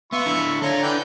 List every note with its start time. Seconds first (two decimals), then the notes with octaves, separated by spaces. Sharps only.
0.13 B3 F4 E5 C#6
0.26 D3 E4
0.62 D4 F4 A4 C#5 A#5
0.83 D3 E3 G5